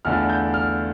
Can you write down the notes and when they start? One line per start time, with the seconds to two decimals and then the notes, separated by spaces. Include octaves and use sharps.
0.05 E2 D3 A3 D4 F4 F6
0.30 G6
0.54 F6